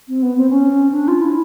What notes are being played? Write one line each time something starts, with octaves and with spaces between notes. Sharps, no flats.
C4
B3
C4
C#4
D4
F4
E4